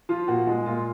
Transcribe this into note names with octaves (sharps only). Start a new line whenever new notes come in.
F3 F4
A#2 F#4
G#3
A#2 F4